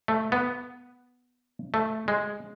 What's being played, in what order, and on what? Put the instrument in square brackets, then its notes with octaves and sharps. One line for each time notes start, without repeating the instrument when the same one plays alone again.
[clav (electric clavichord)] A3
B3
A3
G#3